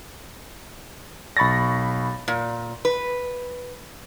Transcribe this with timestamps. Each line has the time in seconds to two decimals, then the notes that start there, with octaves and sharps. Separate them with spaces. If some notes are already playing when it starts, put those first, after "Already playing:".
1.37 B1 B5 C#6 A6 A#6
2.28 A#2
2.85 B4